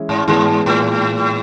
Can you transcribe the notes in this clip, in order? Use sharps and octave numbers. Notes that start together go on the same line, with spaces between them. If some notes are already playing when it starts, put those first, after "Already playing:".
Already playing: E3 G#3 C#4 E4
G#2
G#2 E3 G#3 B3
A2